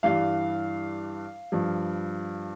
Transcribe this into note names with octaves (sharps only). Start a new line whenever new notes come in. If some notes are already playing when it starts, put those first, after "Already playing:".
G2 E3 G3 F5
G2 F3